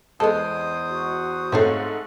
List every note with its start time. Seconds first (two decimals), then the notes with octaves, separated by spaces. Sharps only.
0.20 E2 G#3 B3 A4 C5 D#6
0.90 F#4
1.52 G#2 A3 C4 C#5 F5